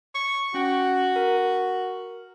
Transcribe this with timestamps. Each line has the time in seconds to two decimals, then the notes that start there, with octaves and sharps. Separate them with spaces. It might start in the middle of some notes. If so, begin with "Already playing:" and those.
0.15 C#6
0.54 C#4 F#4 G5
1.16 A#4